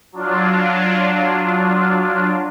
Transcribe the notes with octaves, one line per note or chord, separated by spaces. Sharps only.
F#3 D4 F4